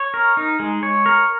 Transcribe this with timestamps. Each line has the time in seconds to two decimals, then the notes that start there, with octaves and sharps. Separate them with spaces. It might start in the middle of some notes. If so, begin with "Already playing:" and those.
Already playing: C#5
0.14 A#4
0.37 D#4
0.60 G#3
0.83 C#5
1.06 A#4